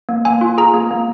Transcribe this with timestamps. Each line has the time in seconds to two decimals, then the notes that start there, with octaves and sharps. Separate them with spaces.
0.09 A#3
0.25 A#3 G#5
0.41 F4
0.58 G#4 A#5
0.74 A#3
0.91 A#3